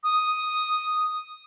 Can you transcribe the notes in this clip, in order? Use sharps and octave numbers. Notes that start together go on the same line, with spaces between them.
D#6